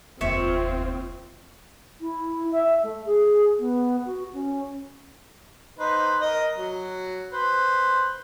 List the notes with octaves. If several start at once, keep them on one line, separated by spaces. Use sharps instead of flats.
F1 D#2 C4 F4 C#5 E5
E4
E5
A3
G#4
B3
F#4
C#4
D#4 B4 C5
A#4 D#5
F#3
B4 C5